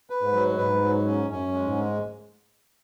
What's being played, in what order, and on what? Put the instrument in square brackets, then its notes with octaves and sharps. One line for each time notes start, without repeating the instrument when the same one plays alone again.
[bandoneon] B4
[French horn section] G#2
[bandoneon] F#3
[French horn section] G#2 [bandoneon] B4
[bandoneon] F#3
C#4
[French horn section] F#2 [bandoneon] C#4
[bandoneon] G#3
[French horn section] G#2
[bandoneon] G#3